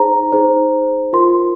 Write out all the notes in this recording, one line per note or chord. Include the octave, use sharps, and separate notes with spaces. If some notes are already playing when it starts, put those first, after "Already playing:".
Already playing: D#4 G#4 C5 A#5
D#4 G#4 C5
F4 A#4 C6